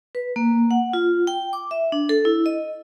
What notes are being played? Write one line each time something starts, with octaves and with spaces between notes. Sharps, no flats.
B4
A#3
F#5
F4
G5
D6
E5
D4
A4
E4
D#5